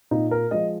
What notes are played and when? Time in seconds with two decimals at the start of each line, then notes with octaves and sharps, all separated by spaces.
0.11 A#2 D#4
0.31 A#4
0.51 F3 G#3 D#5